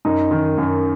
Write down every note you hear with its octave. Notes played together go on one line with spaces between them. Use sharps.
F#2 D#4
D#3
F#2